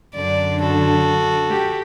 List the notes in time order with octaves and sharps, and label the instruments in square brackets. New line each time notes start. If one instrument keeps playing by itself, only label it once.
[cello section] F#2 D3 D4 [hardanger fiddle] D5
[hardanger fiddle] F#4 A4
[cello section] G4